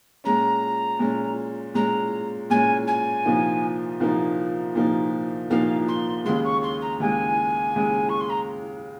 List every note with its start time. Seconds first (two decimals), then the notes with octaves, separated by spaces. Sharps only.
0.24 A#2 G#3 C#4 A#5
0.99 A#2 G#3 C#4
1.74 A#2 G#3 C#4 A#5
2.50 A#2 G#3 C#4 G#5
2.87 G#5
3.25 C2 A#2 F3 A#3 D#4
4.00 C2 A#2 F3 A#3 D#4
4.75 C2 A#2 F3 A#3 D#4
5.50 C2 A#2 F3 A#3 D#4 F5
5.88 C6
6.25 D#2 C#3 G#3 C6
6.43 C#6
6.62 C6
6.81 A#5
7.00 D#2 C#3 G#3 G#5
7.76 D#2 C#3 G#3
8.09 C#6
8.20 C6
8.29 A#5